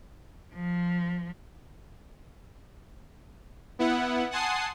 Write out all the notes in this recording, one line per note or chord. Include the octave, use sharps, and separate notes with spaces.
F3
B3 E4 F#5
F#5 G#5 A5 C6 D#6 C7